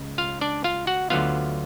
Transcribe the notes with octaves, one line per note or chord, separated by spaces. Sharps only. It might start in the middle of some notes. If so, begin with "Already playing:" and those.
Already playing: C#2 C#3
F4 F5
D4 D5
F4 F5
F#4 F#5
D2 D3 F#3 B3 F4 F5